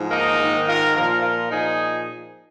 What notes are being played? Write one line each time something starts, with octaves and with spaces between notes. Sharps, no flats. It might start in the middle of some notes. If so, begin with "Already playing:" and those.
Already playing: G#2 F3
A#3 D#4
G#2 D#3
F4 A#4
A#2 F3 F4 A#4
F4 A#4
A#2 F3 D#4 G#4